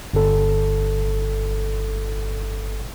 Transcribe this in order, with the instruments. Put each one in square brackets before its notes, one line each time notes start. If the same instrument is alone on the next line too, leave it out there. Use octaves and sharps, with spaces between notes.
[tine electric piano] G1 A4